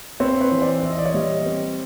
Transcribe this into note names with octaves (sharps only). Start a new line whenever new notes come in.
C4 B4 C#5
B4 C#5
E3
C5 D5
E3 E5
D#5
D5
C#5 D#5
G3
C4